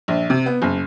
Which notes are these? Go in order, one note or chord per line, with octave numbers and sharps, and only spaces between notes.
A#1
C3
B3
F#1